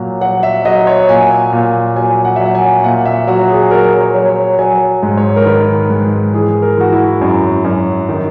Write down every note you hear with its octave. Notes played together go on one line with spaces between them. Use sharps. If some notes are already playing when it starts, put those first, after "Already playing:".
Already playing: A#2 F#3
F#3 F#5
E5
F#3 D#5
C#5
A#2 G#5
A#2
F#3 G#5
F#5
F#3 E5
F#5
G#5
A#2 F#5
E5
F#3 F#4
G#4
F#3 A#4
C#5
F#3
C#5
F#3 G#5
G#2
C#5
A#4
D#3 B4
G#2
E3 G#4
A#4
E3 F#4
E4
F#2
F#2
D#3